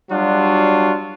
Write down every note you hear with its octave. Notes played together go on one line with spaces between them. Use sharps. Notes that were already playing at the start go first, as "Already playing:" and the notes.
F#3 G3 D4 F4 F#4